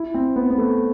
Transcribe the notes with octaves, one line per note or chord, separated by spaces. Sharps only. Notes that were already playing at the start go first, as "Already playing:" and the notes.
Already playing: E4
C4
B3
B3
A3